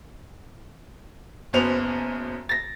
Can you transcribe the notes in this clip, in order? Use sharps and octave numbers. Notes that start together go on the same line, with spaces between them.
F#1 F#2 B3 C5 F7
A6 A#6